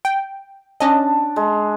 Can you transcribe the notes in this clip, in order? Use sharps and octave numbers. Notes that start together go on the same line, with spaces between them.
G5
C#4 D4 D#5 A5
G#3